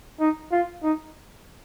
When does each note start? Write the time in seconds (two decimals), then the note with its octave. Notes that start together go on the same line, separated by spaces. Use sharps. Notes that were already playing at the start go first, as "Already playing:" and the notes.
0.20 D#4
0.52 F4
0.83 D#4